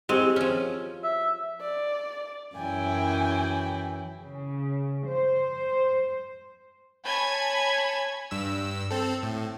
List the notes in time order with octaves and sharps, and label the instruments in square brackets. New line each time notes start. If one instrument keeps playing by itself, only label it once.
[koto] G#3 C4 [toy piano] E4 G4
[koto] F3 C#4
[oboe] E5
[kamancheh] D5
[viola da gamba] F#2 E3 E4 [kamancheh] G5 G#5
[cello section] C#3
C5
[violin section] C#5 G#5 A5 B5 G#6
[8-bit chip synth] G2 E6
C4 A4
A2